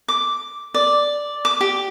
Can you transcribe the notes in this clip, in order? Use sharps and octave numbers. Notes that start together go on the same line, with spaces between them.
D6
D5
D6
G4